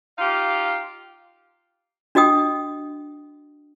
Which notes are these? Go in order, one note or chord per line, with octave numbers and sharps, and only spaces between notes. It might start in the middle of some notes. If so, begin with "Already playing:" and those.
D#4 F4 G4 F5
D4 F#4 D#5 G5 D#6